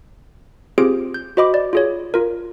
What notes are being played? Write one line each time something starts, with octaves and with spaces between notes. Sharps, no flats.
C4 F4 G4 G#4 C5 D7
G6
F#4 C5 D#5 B5 D6
D5
F4 G#4 C#5
F4 A#4